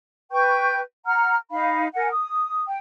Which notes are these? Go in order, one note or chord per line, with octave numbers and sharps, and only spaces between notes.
B4 G5 C#6 G6
F#5 A#5 F6
D#4 F5 B5
A#4 F#5 G#5
D#6
G5